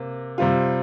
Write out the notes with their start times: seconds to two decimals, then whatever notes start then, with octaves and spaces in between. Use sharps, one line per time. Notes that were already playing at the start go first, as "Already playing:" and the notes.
Already playing: C3 A#3
0.38 C3 G3 C4 F4